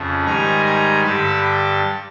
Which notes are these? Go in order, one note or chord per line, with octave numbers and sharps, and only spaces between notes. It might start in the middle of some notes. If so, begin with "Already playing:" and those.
Already playing: F2 C#3 F3
G#2 D#3 G3 G#5 A#5
G#5 A#5
G2 D3 G3 A5 B5
G5 A5